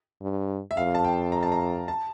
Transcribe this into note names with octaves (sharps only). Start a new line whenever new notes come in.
G2
E5
F2 F5
A5
G5
A#5
A5
A#5
A5